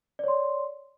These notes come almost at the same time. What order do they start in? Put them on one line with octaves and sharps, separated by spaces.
D5 C#5 C6